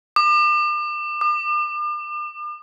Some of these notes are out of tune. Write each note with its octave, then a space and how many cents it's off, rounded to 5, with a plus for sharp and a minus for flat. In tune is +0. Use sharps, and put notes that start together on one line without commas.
D6 +40
D6 +45